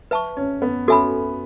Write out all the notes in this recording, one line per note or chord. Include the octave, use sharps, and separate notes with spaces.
B4 E5 A5 C#6
C#4
B3
C#4 F#4 A4 E5 G#5 B5